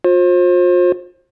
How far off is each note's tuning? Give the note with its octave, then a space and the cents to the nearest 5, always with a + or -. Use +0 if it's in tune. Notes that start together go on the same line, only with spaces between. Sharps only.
F4 +40 C5 +30